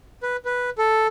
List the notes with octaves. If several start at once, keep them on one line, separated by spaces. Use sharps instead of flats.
B4
B4
A4